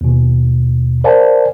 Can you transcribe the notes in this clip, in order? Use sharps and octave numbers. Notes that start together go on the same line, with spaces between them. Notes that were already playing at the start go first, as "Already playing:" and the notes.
D#2 B2
A#4 C5 D5 F5 G#5 A5